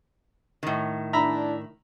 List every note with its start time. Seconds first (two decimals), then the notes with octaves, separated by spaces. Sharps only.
0.63 A2 D#3
1.13 D4 E4 E5 A#5 B5